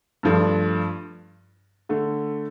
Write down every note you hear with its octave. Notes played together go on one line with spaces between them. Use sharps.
G2 F3 A3 D4
D3 A3